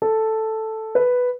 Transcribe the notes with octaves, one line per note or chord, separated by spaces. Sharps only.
A4
B4